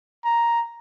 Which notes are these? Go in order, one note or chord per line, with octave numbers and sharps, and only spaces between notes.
A#5